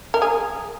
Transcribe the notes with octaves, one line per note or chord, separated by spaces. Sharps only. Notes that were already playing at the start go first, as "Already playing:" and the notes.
A#4
G#4